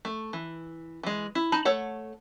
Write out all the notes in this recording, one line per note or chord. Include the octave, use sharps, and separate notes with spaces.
A3
E3
E3 G#3
E4
D#4 A5 B5
A3 A4 C#5 F#5